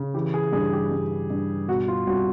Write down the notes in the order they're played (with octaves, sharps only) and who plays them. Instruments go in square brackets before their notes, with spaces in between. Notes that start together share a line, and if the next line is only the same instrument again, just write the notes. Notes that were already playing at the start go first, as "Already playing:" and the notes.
Already playing: [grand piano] C#3
E3 G4
G#4
G2 G#4
G4
G2
G2
B2 F#4
F4
C2 F#4